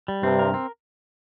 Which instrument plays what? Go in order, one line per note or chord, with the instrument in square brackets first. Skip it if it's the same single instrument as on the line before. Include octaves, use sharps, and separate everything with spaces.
[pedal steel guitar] G3
[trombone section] G2 C3 [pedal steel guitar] C4
[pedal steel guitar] A#4
C4